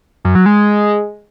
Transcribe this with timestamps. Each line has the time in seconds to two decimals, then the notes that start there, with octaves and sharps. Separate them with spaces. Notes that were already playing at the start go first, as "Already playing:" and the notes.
0.25 F#2
0.35 F#3
0.46 G#3